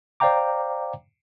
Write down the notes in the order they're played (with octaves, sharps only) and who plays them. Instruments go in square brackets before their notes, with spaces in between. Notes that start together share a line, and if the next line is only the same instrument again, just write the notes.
[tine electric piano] C5 D5 F5 G5 A#5 D6